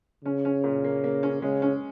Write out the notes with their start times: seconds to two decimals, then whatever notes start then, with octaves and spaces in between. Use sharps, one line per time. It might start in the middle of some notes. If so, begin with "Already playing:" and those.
0.24 C#3 C#4
0.45 C#4
0.64 A#2
0.84 A#3
1.04 A#3
1.23 C#4
1.42 C#3 G#3
1.62 C#4